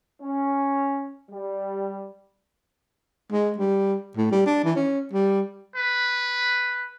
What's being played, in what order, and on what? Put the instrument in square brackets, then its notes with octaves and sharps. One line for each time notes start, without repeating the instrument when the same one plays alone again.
[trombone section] C#4
G3
[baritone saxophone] G#3
G3
A2
G3
D4
E3
C#4
G3
[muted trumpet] B4